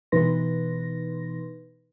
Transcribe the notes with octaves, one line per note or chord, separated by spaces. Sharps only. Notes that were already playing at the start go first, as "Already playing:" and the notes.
B2 E3 D#4 B4 C6 A#6